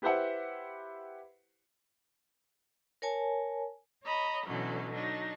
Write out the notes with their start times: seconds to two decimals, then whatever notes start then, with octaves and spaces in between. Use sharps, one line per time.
0.02 E4 G4 B4 C5 E5 F#5
3.02 A#4 C#5 G#5 A5
4.04 C#5 D#5 A#5 B5
4.45 B2 D3 E3 F#3 C#4
4.92 F#3 D4 D#4